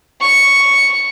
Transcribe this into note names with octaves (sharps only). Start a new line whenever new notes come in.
C#6